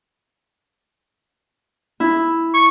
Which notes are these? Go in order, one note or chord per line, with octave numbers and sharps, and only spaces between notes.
E4
C#6